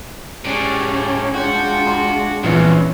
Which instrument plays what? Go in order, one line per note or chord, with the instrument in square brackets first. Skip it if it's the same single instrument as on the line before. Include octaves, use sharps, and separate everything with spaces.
[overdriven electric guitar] A2 D4 [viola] G#3 C#4 [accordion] G4
[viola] G#3 D4 [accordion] F4 G5 [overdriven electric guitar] F#4
[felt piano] C6
[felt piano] A#1 E3 [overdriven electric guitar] E2 G2 [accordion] C4 C#4